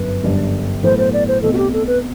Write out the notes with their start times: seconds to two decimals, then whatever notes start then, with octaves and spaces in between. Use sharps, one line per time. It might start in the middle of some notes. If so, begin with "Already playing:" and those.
Already playing: G1 F#2 F#3 B4
0.23 G1 F#2 D3 G3 D4
0.83 A2 F#3 B3 E4 A4 C5
0.98 C5
1.13 D5
1.28 C5
1.42 B1 B2 A3 C4 A4
1.53 F#4
1.58 G4
1.73 A4
1.87 B4